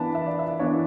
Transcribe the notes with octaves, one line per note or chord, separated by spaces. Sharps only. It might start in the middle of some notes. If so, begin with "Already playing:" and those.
Already playing: E3 B3 D4 A5 B5
E5
D5
E5
E3 B3 D4 C#5